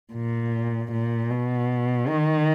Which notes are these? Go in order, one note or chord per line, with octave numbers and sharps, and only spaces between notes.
A#2
A#2
B2
D#3